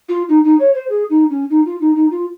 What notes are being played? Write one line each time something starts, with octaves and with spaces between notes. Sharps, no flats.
F4
D#4
D#4
C#5
C5
G#4
D#4
C#4
D#4
F4
D#4
D#4
F4